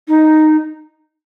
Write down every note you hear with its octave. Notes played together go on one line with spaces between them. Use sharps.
D#4